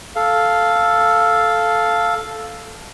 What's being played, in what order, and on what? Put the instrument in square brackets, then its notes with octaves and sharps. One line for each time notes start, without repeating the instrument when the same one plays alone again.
[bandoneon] A4 F5